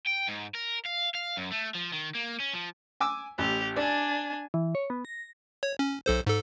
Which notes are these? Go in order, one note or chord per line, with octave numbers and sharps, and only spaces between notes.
G5
G#2
A#4
F5
F5
F#2
A3
F3
D#3
A#3
C#4
F3
G#5 D6 E6
A1 G4 F7
D4 D5 G#5
E3
C#5
B3
A#6
C#5
C#4
B1 A4 C5
G#2 A4